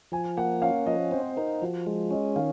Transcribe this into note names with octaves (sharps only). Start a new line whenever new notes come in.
F3 G#5
A#3 F#5
C#4 F5
F3 D#5
C4 C5
D#4 A#4
F3 F#4
G#3 F4
C#4 D#5
D#3 F5